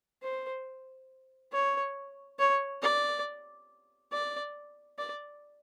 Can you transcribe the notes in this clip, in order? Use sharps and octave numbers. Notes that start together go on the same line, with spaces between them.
C5
C#5
C#5
D5
D5
D5